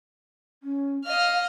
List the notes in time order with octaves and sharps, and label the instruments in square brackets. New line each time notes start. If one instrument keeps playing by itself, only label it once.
[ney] C#4
[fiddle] D#5 F6 [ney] F5